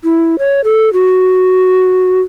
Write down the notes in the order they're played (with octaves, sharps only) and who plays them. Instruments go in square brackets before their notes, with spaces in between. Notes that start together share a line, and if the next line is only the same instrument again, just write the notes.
[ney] E4
C#5
A4
F#4